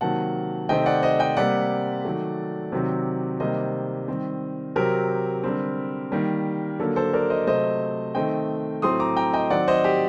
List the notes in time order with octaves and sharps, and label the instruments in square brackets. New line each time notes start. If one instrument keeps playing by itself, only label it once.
[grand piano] C3 D#3 F#3 A#3 F#5 A5
C3 D#3 A3 C4 D#5 G5
D5 F#5
C5 D#5
D#5 G5
C3 G3 A#3 D5 F#5
D#3 F#3 A3
C3 D#3 F#3 C4
C3 D#3 G3 A#3 C5 D#5
D#3 G3 C4
C3 F#3 C4 G4 A#4
D3 G3 C4
D#3 G3 A#3
D3 F#3 A#3 A4
A4 C5
A#4 D5
C5 D#5
C3 F#3 A3 C5 D#5
D#3 A3 C4 D#5 G5
A2 F#3 A3 C4 C6 D#6
A#5 D6
G5 A#5
D#5 G5
D#3 F#3 C4 D5 F#5
C5 D#5
G4